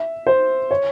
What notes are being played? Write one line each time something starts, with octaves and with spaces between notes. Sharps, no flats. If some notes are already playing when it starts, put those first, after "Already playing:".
Already playing: E5
C5
C#5